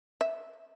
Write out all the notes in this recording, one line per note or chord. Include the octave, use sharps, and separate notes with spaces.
E5